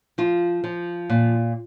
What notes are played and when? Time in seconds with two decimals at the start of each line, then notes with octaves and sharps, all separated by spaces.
0.18 F3 F4
0.64 F3
1.10 A#2